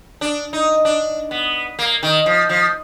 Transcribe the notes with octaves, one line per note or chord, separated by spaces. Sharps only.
D4
D#4
D4
B3
A#3
D#3
F3
F3